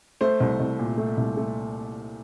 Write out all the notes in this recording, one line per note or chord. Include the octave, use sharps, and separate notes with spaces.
A3 C5
C2
C2
A#2
A3
C2
A3